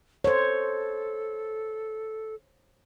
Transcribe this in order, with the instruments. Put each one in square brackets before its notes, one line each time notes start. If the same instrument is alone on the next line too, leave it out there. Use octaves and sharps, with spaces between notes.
[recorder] A4 [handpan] C5 C#5